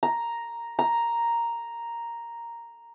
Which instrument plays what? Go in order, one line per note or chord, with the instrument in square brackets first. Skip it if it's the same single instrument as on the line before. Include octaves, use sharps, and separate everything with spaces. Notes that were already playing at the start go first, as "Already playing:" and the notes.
[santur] A#5
A#5